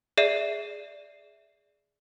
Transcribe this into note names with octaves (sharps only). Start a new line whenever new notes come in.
G#4 D5 E5 C7 D#7